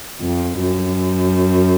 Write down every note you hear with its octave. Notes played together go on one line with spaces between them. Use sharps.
F2
F#2